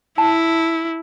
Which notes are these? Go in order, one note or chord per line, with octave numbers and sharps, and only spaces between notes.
E4 A5